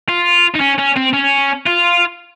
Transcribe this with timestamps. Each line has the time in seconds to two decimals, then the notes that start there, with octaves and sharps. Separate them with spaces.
0.09 F4
0.55 D#4
0.61 C#4
0.79 C#4
0.97 C4
1.14 C#4
1.67 F4